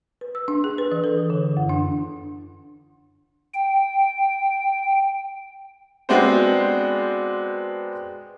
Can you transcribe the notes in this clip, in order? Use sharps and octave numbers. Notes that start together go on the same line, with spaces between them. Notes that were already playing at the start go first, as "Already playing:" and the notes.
B4
E6
D4
G#4
B4
E3
A4
D#6
D3
F#2
D4
G5
G#3 B3 C4 D4 F#4 C5